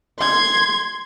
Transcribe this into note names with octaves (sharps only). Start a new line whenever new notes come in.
C6 G#6